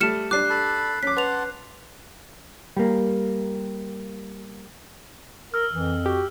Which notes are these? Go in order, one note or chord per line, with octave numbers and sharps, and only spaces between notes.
G3 A3 F6 C#7 E7
G3 D4 D6 F#6 C7
A4 A5 B5
C#4 D6 B6
B4 F#5 A5 C6 F7
G3 A#3
A#4 E6 F6
F2 E3
F#4 G4